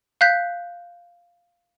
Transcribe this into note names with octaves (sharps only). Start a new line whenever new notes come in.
F5 F#6 G6 B6